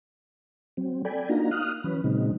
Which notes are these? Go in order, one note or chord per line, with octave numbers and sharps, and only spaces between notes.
F#3 C4
A4 D5 G5 G#5 B5
A#3 D4 D#4 F4 F#4 A#5
F5 D#6 F6 F#6
E3 F#3 C#4 B4
A#2 C#3 F#3 G#3 C4 D#4